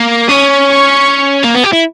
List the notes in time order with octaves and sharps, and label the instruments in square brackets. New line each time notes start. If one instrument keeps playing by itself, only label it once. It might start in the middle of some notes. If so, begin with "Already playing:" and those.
Already playing: [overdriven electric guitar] A#3
[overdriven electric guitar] C#4 [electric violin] D#6
[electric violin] C#6
[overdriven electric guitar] A#3
B3
G4
E4